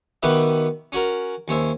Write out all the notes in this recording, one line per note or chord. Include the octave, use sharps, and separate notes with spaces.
B2 D#3 G4 B4 E5
C#4 F#4 A#4
D#2 C#4 C5 E5